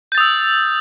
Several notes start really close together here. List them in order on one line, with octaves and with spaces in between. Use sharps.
G6 A6 D#6 E6